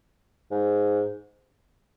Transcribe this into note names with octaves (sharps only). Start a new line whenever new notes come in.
G#2